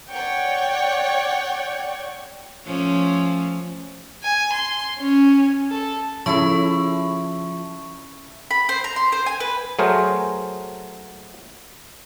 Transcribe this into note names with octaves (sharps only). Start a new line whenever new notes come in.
C#5 D5 F#5 G5 C#6
F3 A3 C#4
G#5
C6
C#4
A4
C#3 F3 E4 A4 A5 C#6
B5
C5
A#5
C6
C5
G#5
B4
F#3 A3 G#4 A#4 C5